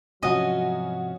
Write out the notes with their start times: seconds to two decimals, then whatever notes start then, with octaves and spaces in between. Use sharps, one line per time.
0.23 G#2 C3 F3 F#3 C#4 F#4 D#5